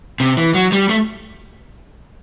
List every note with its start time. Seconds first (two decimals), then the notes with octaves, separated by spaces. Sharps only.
0.20 C3
0.37 E3
0.54 F#3
0.72 G3
0.89 A3